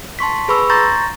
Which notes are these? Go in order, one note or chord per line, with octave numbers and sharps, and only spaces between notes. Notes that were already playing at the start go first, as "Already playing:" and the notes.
A5 C6 C#6 B6
G#4 B4 B5 C#6 E6
A#5 C6 C#6 G6 A6 A#6